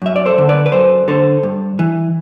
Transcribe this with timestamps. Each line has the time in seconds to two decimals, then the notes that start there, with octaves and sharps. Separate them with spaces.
0.02 F#2 E5
0.16 D5
0.26 A4 C5
0.38 D3
0.49 B4 D5
0.66 B4
0.72 F#2 A4 C5
1.08 D3 A4 C5
1.43 G2
1.79 E3